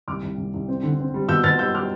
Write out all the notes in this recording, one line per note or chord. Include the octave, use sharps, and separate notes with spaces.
C2 D6 F6
C2
C2
C2
C4
D3
C4
G3
B2 E6 G6
B2 F6 A6
G3 E6 G6
G3 D6 F6